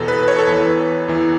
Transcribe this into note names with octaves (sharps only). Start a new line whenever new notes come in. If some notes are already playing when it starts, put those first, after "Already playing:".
Already playing: E2 B2 A4
B4
B4
C#5
A4
E2 E3 B4
E2 E3